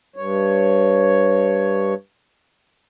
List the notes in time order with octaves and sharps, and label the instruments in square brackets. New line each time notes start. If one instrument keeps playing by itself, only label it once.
[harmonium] G2 C#5